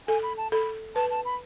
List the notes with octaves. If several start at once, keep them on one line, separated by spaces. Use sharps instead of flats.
A4 G#5
B5
A5
A4 B5
B4 A5
A5
B5